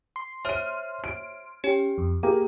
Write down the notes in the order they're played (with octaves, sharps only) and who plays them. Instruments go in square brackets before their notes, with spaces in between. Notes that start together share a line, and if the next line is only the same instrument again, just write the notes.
[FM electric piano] C6
[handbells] C5 C#5 E5 [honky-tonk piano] F6 D#7
[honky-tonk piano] D7
[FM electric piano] C#4 [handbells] G4 G5
[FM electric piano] F2
[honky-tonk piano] A#3 [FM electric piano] G4 G#4 [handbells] A#5